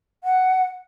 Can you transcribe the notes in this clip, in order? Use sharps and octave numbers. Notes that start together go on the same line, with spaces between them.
F#5